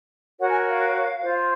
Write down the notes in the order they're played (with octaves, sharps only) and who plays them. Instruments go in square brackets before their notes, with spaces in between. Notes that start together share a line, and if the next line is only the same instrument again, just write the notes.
[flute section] F#4 A#4 C#5 F#5
G#5
F5
F4 C5